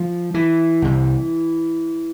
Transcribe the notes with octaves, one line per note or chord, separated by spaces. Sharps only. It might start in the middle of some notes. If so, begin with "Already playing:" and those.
Already playing: F3
E3
C2 C3